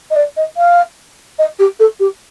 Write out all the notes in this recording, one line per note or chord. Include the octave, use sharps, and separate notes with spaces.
D#5
D5
D#5
F5
D#5
G4
A4
G4